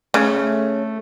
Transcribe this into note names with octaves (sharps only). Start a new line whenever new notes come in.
C#3 A3